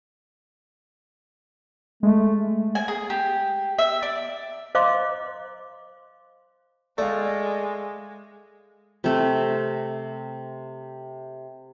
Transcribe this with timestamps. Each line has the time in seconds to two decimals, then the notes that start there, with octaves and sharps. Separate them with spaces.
2.03 G#3 A3
2.75 G#5
2.88 G#4
3.10 G4
3.79 E5
4.03 D5
4.75 C5 D#5 F5 A#5 C6 D6
6.98 G#3 A3 D5 F5
9.04 C3 A3